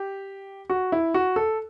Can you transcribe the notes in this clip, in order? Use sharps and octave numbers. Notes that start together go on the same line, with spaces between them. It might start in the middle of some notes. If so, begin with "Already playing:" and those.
Already playing: G4
F#4
E4
F#4
A4